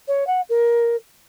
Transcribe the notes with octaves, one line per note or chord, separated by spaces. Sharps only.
C#5
F#5
A#4